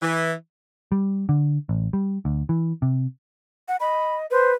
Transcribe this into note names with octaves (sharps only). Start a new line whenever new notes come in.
E3
G3
D3
A1
G3
D2
E3
C3
F#5
D#5 B5
B4 C5